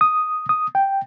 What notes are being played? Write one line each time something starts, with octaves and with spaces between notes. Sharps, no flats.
D#6
D#6
G5